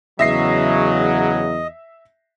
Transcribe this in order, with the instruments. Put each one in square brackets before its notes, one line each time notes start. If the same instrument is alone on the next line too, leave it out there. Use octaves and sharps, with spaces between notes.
[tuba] E2 [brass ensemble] C#3 F#3 [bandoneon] D#5 [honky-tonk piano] E5 A#6 C7